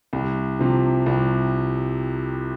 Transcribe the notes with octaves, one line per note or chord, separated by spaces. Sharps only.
C2
C3 F3
C2